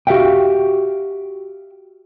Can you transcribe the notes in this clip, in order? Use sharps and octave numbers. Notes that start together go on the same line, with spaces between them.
F#4 G4 B4 E5 F5 G5